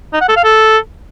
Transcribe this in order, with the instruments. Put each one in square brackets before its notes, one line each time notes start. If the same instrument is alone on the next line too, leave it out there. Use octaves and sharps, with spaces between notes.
[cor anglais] D#4
F#5
A4
F5
A4